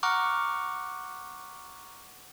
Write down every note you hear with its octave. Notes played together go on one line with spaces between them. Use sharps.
F#5 A#5 C#6 D6 F6 F#6